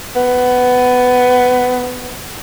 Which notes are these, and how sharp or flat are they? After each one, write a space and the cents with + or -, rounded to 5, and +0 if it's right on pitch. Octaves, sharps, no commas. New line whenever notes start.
B3 +15